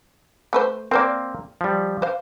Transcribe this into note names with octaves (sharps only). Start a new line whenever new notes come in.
A3 B4 C5
A#3 C4 A#4 C5 D5
F3 G3
C5 F5